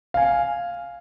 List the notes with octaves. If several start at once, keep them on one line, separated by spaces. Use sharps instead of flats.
F5 G#5